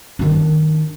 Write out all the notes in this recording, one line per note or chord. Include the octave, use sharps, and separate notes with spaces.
D#3 D4